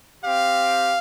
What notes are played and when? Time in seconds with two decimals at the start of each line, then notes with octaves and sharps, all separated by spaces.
0.23 C4 G4 F5